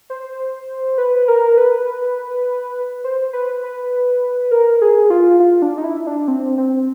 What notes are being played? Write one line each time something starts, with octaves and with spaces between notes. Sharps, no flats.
C5
B4
A#4
B4
C5
B4
B4
A#4
G#4
F4
F4
D4
D#4
E4
D4
C4
C4